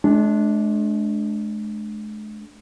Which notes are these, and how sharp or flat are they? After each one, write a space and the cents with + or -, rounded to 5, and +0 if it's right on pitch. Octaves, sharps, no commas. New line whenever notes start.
G#3 +45 D4 +0